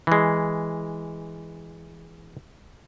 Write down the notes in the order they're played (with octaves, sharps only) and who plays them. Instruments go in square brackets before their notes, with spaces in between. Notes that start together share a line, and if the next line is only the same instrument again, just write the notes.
[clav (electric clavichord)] E3 G#3